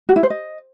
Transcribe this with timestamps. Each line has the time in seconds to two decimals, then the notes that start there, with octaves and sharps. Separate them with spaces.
0.09 F#4
0.16 E4
0.23 C5
0.30 D#5